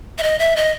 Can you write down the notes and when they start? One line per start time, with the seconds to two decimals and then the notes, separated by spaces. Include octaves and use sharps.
0.18 E5
0.23 D#5
0.39 E5
0.57 D#5